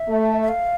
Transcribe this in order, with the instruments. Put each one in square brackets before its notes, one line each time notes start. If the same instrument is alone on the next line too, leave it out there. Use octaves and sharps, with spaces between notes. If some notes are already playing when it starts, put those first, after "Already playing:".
Already playing: [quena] E5
[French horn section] A3
[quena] E5
F5